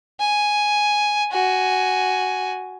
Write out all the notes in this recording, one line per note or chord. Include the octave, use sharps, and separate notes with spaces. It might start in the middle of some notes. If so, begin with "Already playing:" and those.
G#5
F#4 G#5